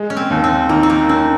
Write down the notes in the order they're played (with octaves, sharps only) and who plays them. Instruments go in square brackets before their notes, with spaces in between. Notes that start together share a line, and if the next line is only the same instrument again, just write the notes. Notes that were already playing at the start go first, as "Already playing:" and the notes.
Already playing: [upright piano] G#3
[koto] C#4
C4
[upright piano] D#2
[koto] C4
[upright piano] D#3 [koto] A#3
[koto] C4
A#3
[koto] C4 [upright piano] C#4